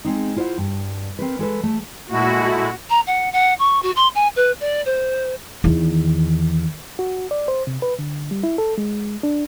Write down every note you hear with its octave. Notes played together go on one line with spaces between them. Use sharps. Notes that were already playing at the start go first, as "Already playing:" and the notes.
G#3 C4 D#4
E4 F4 C5 D#5 F#5
G2
C4 A#4 B4
G#3 A4 B4
A3
A#2 G#3 A3 E4 F#4
A#5
F#5
F#5
C#6
F#4
C6
G#5
B4
D5
C5
E2 D#3
F#4
D5
C5
C3
B4
D3
G3
E4
A4
G#3
D4